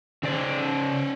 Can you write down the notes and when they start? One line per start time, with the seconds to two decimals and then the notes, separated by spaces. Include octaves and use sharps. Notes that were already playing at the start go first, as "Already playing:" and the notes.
0.23 C#3 C#4 C5 D5